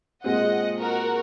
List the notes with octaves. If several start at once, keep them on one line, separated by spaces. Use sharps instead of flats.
A#2 G#3 C4 D#5 F#5
F#4 A#4